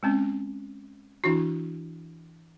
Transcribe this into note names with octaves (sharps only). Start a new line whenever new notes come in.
G#3 C4 C#4
E3 D4 E4 F#4